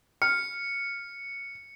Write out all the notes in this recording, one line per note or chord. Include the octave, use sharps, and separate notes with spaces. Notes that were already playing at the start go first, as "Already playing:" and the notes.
F6 C#7